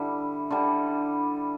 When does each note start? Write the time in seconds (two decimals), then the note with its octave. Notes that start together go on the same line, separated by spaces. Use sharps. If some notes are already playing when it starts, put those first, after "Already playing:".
Already playing: D3 G3 E4
0.50 D3 G3